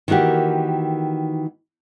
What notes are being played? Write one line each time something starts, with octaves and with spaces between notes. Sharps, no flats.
D#3 E3 A#3 F#4 G4